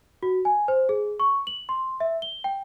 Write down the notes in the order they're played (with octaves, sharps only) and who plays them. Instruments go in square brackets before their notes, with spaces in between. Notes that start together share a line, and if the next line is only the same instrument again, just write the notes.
[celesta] F#4
G#5
C5
G#4
C#6
F#7
C6
E5
G7
G5